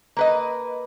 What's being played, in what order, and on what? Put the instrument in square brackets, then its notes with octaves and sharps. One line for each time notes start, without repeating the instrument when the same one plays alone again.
[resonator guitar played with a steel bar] A#3 B4 D#5